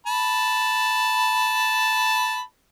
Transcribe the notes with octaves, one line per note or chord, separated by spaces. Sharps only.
A5 B5